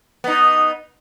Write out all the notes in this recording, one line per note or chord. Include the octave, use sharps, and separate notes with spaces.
B3 D#4